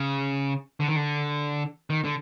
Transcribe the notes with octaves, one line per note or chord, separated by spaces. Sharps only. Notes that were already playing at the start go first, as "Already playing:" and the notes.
Already playing: C#3
D3
D#3
D3
D#3
D3